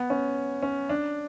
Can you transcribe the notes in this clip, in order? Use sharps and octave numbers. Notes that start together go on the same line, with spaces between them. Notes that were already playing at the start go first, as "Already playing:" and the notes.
Already playing: B3
C#4
C#4
D4